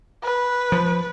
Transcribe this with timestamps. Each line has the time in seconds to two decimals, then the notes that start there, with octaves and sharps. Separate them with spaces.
0.24 B4
0.72 F3